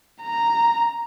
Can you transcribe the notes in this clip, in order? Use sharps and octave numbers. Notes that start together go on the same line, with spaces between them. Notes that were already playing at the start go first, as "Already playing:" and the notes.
A#5